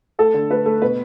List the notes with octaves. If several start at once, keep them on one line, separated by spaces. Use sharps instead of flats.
A3 A4
D3
A3 B4
A3
B2 B4